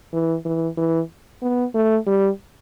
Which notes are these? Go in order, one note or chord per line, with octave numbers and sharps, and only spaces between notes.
E3
E3
E3
B3
A3
G3